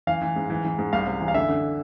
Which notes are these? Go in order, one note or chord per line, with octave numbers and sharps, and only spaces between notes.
E3 F5
E3
G#2
E3
E3
G#2
C2 F5
C3
E3
F5
D3 E5
D3